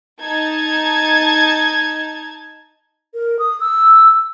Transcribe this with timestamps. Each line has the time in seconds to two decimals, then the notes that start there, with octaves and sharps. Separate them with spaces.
0.21 D#4 A5 G#6
3.14 A#4
3.39 D#6
3.60 E6